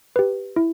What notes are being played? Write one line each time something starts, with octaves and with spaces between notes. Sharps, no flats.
G4 B4
E4